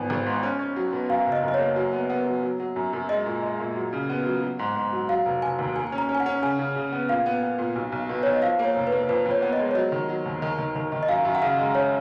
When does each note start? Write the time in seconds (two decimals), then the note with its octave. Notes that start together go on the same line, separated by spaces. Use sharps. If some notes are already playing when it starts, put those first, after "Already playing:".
Already playing: G#1 F3 B3 G#5
0.10 G#1
0.26 G#2
0.43 C#4
0.59 C#4
0.76 F#3
0.93 B2
1.09 F#2 F5
1.26 F#1
1.32 D#5
1.43 F#2 D#5
1.54 C#5
1.59 A#3
1.76 F#3
1.93 B3
2.10 B3
2.26 F#3
2.43 F#3
2.60 F#3
2.76 F#2
2.93 F#2
3.09 G#3 D#5
3.26 A#2
3.43 G#3
3.59 A#2
3.76 F#3
3.93 C#3
4.09 B3
4.26 F#3
4.43 F#3
4.59 G#2
4.76 G#2
4.92 F#3
5.09 F#3 F5
5.26 F1
5.42 F1 G#5
5.59 D#2
5.76 A#3 G#5
5.87 G#5
5.92 C#4
5.98 A#5
6.09 C#4
6.15 G#5
6.20 F#5
6.26 C#4
6.42 C#3 G#5
6.59 C#3
6.76 C#3
6.92 B3
7.09 A#2 F5
7.26 B3
7.42 B3
7.59 A#2
7.76 B1
7.92 B1
8.09 B2
8.23 B1 C#5
8.33 D#5
8.42 F3 F5
8.59 A#3
8.64 C#5
8.76 F1
8.87 B4
8.92 A#3
9.09 F2 B4
9.26 F2
9.31 C#5
9.42 B3
9.53 D#5
9.59 G#3
9.71 C#5
9.75 F#3 D#5
9.92 D#3
10.09 F#3
10.26 D#2
10.42 D#3
10.58 D#3
10.75 D#3
10.92 D#3
11.03 D#5
11.08 F#2 F5
11.25 F#2
11.35 F#5
11.42 C#3 F5
11.59 G#3
11.75 C#5